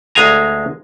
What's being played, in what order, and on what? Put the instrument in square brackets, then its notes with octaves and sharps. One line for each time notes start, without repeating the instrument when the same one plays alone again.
[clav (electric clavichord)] D2 G#3 F5 G#5 A#5